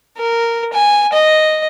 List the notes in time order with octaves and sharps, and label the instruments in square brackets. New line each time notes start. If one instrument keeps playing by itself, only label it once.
[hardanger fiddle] A#4
G#5
D#5